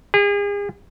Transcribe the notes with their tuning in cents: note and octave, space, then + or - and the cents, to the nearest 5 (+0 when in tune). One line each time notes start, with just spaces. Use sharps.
G#4 -40